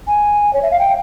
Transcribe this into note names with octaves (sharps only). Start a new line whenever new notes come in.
G#5
C#5
E5
F5
G5